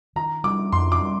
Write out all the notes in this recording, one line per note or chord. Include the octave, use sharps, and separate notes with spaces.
D#3 A#5
G3 D6
F2 C6
D6
G3